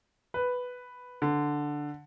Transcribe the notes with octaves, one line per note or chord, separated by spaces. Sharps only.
B4
D3